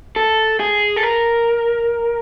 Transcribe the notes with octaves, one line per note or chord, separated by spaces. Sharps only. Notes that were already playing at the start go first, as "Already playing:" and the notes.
A4
G#4
A4
A#4